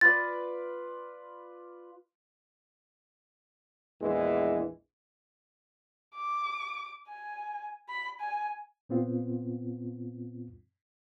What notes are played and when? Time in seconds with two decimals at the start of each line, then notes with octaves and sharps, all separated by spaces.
0.01 F4 B4 D5 A6
4.01 A#1 E2 E3 G#3
6.15 D6
7.09 G#5
7.89 B5
8.20 G#5
8.89 A#2 B3 C4 F4